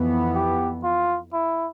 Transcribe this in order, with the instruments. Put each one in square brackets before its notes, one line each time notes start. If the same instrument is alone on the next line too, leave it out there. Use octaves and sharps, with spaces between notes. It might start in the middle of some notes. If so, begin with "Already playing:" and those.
Already playing: [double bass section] F2 E3 B3
[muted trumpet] G4
F4
E4